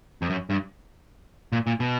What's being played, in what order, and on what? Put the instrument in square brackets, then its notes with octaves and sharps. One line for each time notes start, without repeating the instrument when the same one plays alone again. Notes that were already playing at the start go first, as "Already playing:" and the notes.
[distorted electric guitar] F2
F#2
G2
A#2
A#2
B2